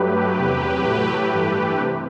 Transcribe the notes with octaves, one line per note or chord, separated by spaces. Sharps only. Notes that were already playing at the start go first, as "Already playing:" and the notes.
Already playing: G2 F#3 A3 G4 B4
E2 C3 F#3
A2 F#3 A3
G2 E3 A3
C3